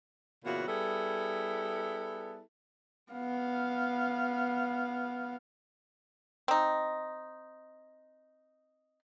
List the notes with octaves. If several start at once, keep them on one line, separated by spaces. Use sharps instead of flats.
A#2 C#3 E3 B3 F#4
G3 B3 E4 G#4 A4
B3 F5
C4 D#4